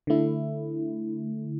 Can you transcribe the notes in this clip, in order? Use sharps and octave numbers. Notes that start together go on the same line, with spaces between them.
D3 A3 E4